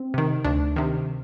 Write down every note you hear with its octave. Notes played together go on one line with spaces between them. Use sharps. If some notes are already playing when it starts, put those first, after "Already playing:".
Already playing: C4
C3 D#3
D2 D4
C3 D#3